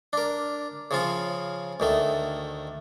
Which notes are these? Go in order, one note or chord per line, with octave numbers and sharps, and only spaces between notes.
D4 A#4
C#3 F3 F4
D2 D#3 A3